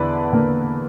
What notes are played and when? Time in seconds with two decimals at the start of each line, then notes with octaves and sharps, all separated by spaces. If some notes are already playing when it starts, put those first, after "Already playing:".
Already playing: E2 D3 E4 B4 D5
0.33 D3 A#3